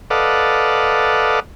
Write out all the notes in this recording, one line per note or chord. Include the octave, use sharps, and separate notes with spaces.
A4 B4 D5 D#5 F5 F#5